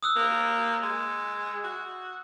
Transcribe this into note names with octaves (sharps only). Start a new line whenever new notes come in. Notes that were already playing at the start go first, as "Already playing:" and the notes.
D#6 E6 F#6
A#3
G#3
F#4